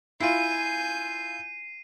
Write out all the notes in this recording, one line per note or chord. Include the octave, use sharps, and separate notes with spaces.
E4 F4 G#5 G6 C7 D#7